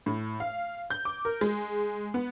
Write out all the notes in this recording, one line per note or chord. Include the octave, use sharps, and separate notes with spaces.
A2
F5
G6
D6
A#4
G#3
B3